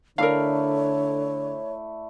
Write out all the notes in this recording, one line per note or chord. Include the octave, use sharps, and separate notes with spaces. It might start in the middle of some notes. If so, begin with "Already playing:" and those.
D3 A3 E4 A#4 C#5 D5 F5